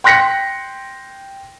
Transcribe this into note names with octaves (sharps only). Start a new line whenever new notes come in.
G5 C6 F#6 A#6 B6 C#7